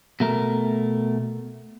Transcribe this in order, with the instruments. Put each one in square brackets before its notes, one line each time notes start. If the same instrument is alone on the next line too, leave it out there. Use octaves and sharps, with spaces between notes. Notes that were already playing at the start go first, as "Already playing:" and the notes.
[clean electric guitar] B2 A3 A#4